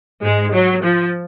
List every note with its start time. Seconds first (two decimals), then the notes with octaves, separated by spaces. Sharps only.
0.22 G#2 G#3
0.53 F#3
0.83 F3